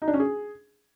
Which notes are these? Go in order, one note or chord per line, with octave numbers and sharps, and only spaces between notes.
D#4
D4
C#4
G#4